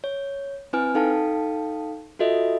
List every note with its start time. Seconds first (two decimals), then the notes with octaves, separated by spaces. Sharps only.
0.04 C#5
0.73 C4 E4 B4 G#5 F6
0.95 D#4 A4 F5 G5 A5
2.19 F4 F#4 A4 D#5 E5